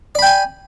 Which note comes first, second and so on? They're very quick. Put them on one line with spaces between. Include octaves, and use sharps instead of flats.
D5 B5 G5 G#5